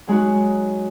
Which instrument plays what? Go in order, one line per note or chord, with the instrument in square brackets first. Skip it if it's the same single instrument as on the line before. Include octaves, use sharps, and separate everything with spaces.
[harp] F#3 G#3 D#4 F#4